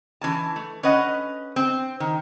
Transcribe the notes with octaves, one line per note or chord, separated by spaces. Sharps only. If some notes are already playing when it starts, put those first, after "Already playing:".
E3 C#4 A5
A3
C#4 B4 D#5 F#5
C4
D#3